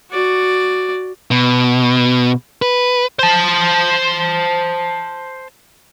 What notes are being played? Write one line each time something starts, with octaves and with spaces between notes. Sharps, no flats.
F#4 D5
B2
B4
C5 A5